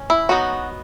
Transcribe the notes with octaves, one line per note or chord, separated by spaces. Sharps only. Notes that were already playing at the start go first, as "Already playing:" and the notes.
Already playing: C#4
E4
F#3 B3 D#4 F#4